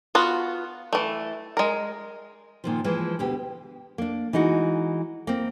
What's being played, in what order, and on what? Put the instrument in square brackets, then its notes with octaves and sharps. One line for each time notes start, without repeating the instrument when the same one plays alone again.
[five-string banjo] B3 F4 F#4
E3 A3
G#3 A#4
[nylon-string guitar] A#2 D#3 F3
E3 F3 G#3
D2 B2 G4
A#3 D4
E3 G#3 D#4 F#4
A#3 C4